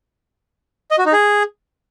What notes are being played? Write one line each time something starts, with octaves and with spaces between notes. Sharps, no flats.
D#5
F#4
D#4
G#4